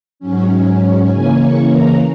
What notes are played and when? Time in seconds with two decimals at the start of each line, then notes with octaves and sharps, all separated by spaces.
0.20 G#2 F#3 C#4
1.10 C#3 E3 A#3 C#4 G#5
1.40 C#6
1.71 A#5